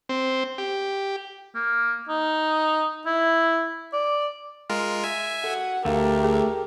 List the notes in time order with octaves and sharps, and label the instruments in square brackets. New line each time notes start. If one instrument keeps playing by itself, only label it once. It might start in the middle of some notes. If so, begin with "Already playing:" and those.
[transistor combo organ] C4
G4
[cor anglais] A#3
D#4
E4
D5
[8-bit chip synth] G#3 F4 A#4
E5 G#5
[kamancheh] F#4 F#5 [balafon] A4
[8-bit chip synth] D2 [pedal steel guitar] A3 [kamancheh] G4 A#4 [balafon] F5
[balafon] G#4